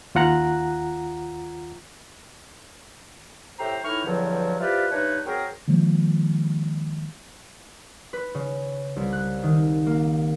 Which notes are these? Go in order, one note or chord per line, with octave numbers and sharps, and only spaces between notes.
D#2 F4 F#5 A#5 F#6
A2 G4 C5 E5 A#5
A2 E3 D#4 E4 C#6 F6
E2 G2 D3 F3 F#3
E4 F4 G4 B4 C5 D5
G2 D4 D#4 B4 C#5 E5
F#3 C4 G#4 A#4
D#3 F3 G#3 A#3
B4
C#3
C2
F#6
D#3
A#3